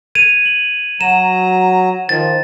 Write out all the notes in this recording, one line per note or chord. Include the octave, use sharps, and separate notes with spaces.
G#6 D#7 F7
F#7
F#3 A#5 E7
D#3 F3 A6